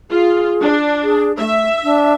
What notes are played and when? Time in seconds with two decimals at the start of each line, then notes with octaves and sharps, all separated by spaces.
0.10 F4 G#4
0.61 D4
1.04 G#4
1.38 A3 E5
1.84 D4